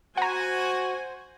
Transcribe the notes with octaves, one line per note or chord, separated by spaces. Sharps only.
F#4 C5 F#5 G#5 A#5